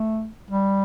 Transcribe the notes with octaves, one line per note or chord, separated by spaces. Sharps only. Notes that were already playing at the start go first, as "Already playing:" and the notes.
Already playing: A3
G3